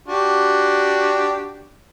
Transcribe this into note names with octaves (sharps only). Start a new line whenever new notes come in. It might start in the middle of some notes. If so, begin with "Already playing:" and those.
D4 F#4 G4